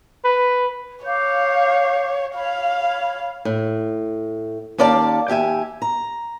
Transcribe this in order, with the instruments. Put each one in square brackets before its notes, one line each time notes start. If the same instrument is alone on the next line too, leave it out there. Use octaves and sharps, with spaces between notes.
[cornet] B4
[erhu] C#5 [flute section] F5 D6 G6
[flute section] C#5 B5 [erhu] F5
[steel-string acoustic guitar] A2
D#2 C#4 D5 F5 A5
D#2 G4 E5 G#5
A#5